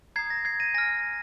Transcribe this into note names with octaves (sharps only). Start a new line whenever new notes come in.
A#5 D#6 G#6 C7
A#6
G#6 C7
A#6 D#7
G#5 F6 A#6